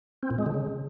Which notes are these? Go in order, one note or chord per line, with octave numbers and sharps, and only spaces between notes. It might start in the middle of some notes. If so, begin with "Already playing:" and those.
C4
A#2
G#3
D3
C#3